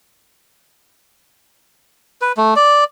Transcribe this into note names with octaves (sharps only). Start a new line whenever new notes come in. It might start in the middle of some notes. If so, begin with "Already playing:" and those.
B4
A3
D5